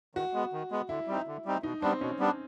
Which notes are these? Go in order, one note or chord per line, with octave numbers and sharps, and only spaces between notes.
D#3 F#4
G#3 B3
D#3
G#3 B3
D3 E4
G3 C4 D#4
D3
G3 C4 D#4
B2 D#4
G3 B3 C4 D4
B2 C#4
G3 B3 D4